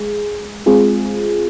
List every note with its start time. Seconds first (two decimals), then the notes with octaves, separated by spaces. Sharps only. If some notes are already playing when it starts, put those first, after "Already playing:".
Already playing: G#3 G#4
0.66 G#3 C4 F4 G#4